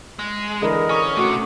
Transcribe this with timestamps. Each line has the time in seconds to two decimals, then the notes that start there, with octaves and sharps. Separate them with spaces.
0.19 G#3
0.62 D3 E3 G#4 A#4 D#5 B5
0.89 C#4 G#5 C#6 D#6
1.17 C3 A3 C#4 F#4